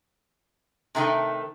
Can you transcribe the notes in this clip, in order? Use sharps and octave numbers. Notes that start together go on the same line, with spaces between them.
C3 D#3 A3 D#4